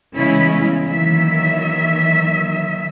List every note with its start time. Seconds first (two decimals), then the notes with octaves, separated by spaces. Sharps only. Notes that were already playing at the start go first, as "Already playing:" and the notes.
0.16 C#3 E3 G#3 B3 C#4 E4
0.88 D#3 E3 F#3 A#3 E5